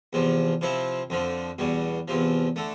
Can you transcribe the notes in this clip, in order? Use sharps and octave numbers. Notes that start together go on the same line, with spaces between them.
E2 C3 F3
C3 F3 C4 E4
F2 D3 F3
E2 B2 G3
E2 C3 F3
D3 A3